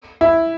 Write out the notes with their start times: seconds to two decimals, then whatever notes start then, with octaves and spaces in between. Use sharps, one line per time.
0.21 E4